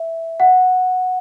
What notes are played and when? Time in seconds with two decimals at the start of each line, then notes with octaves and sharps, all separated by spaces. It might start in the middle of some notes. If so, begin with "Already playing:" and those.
Already playing: E5
0.40 F#5